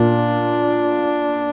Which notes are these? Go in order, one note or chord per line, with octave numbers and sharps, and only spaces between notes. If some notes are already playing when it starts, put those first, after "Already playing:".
Already playing: A#2 A#3 D4